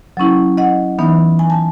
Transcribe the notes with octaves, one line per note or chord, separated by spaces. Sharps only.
F#3 C#4 E4
D#5 F#5
E3 B3 D#4
G#5
A5